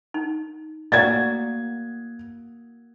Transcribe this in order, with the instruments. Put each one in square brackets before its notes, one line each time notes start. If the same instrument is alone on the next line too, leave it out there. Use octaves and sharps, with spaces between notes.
[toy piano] D#4
[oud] A#3 F#4 [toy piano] D5 F5 [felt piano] G#6 A6